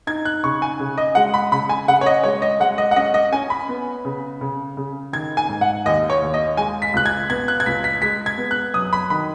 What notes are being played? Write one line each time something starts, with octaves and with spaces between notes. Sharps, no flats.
D#4 G#6
F#6
C#3 C#6
G#5
C#3
D#5
G#3 F#5
B5
C#3 B5
G#5
C#3 F#5
C#5
D#5
G#3 C#5
D#5
G#3 F#5
D#5
F#5
C#4 D#5
D#5
C#4 G#5
B5
B3
C#3
C#3
C#3
D#3 G#6
G#5
G#2
F#5
D#2 D#5
C#5
D#2
D#5
G#3 G#5
B6
C#2 F#6
G#6
B3 G#6
F#6
G#6
C#2 B6
B6
G#3 B6
G#6
B3
F#6
F#2 D#6
B5
D#3 B5